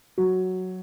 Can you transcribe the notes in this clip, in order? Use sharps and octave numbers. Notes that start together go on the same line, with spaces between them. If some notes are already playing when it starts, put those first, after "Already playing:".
F#3 F#4